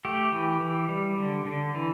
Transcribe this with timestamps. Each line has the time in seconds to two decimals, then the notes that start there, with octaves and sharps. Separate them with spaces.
0.05 A3 G4
0.32 E3
0.61 E3
0.89 G3
1.18 D3
1.46 D3
1.75 E3